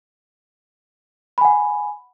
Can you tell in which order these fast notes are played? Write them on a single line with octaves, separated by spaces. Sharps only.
B5 G#5 F#5